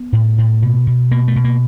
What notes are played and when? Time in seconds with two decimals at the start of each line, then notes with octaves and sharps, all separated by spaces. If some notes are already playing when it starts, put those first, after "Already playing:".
Already playing: B3
0.13 A2
0.38 A2
0.62 B2
0.87 B2
1.11 B2 A#3
1.28 A3
1.36 B2
1.44 A#3